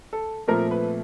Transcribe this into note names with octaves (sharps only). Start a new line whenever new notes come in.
A4
A#2 F3 A3 C4 A#4
B4